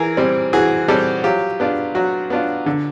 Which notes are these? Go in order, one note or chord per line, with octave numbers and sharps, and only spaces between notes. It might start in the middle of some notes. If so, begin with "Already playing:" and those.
Already playing: E3 G#4 A#4
G3 C4
E3 F#4 G#4
G3 C4 G4 A4
F#3 F4 G4
B3 D4 F4
F#3 F#4
B3 D4 F4
D3